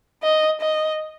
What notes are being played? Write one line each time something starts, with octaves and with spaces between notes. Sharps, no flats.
D#5
D#5